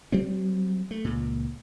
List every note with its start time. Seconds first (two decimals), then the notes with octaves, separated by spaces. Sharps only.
0.12 F#3 G3 C4
0.91 A3
1.04 C#2 A#2